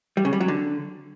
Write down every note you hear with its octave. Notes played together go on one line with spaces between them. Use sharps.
G3
C#3
G3
F#3
D3